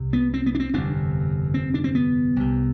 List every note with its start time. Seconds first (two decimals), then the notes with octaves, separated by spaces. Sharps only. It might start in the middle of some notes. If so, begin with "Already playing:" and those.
Already playing: C2 C3
0.13 B3
0.34 C4
0.46 B3
0.55 D4
0.60 C4
0.74 G1 F2 C3 D4
1.54 C4
1.74 D4
1.84 C4
1.95 B3
2.36 C2 C3